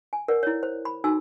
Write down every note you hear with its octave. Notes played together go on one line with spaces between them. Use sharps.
G#5
A#4 B4 D5 F#5
E4 C#5
C5
B5
D#4 F#4 A4 G#5 E6